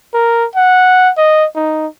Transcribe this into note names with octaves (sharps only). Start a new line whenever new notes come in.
A#4
F#5
D#5
D#4